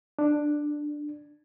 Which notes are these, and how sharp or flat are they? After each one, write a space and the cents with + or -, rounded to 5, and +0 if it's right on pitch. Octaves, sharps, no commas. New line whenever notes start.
D4 +10